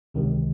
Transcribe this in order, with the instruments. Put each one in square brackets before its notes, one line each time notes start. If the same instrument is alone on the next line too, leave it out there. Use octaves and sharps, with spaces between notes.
[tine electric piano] C#2 C3 D#3